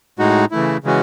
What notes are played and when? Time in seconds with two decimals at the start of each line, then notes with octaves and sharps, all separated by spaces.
0.19 A2 G#3 D#4 F#4
0.51 C#3 E3 A3 E4
0.84 C#3 E3 G#3 C#4 F#4